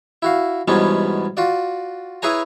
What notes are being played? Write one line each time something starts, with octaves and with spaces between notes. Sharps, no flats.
E4 F#4 F5
E2 G#2 B2 G3 B3 C#4
F4 F#4 D5
E4 G#4 B4 C#5 G#5 A#5